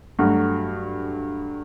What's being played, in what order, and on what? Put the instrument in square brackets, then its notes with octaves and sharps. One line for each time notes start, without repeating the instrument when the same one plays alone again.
[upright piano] G2 F#3 A3 F#4